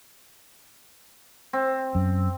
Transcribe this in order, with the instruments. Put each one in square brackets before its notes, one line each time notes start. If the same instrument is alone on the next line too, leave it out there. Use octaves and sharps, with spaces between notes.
[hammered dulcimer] C4
[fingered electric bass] F#2